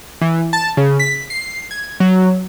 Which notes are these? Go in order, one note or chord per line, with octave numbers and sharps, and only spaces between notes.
E3
A5
C#3
B6
C7
G#6
F#3